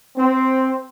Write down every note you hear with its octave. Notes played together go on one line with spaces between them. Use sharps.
C4